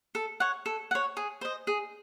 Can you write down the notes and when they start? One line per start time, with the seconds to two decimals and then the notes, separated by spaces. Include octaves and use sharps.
0.15 A4
0.40 C#5 F#5
0.66 A4
0.91 C#5 F#5
1.17 G#4
1.41 C5 D#5
1.67 G#4